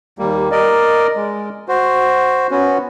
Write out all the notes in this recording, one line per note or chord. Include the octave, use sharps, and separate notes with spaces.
D#2 G3 A#3
A#4 D5 D#5
G#3
F#4 C5
B3 C#4 F#4